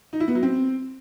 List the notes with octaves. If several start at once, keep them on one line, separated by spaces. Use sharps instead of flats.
D#4
E4
B3
F#3
C4